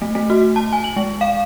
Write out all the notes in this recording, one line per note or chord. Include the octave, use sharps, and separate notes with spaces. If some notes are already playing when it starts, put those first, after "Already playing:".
A3
A3
F#4
A5
G#5
F#7
G#3
F5